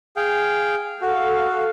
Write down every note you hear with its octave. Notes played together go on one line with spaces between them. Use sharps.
G#4 F5 G5
F#4 A4 F5